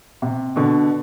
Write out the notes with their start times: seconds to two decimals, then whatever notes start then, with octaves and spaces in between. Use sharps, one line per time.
0.22 C3
0.56 B2 D3